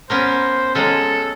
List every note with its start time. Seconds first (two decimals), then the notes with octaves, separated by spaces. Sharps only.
0.10 B3 C#4 A#4 C5
0.75 F#3 G#3 C#4 A4